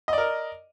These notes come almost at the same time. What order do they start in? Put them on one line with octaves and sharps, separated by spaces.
D#5 D5 A#4